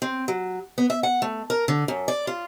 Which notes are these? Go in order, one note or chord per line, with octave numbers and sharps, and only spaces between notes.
C4
F#3
B3
E5
F#5
A3
A#4
D3
F#2
D5
F4